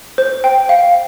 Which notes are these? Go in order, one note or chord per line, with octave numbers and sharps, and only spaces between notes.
C5
G5
F5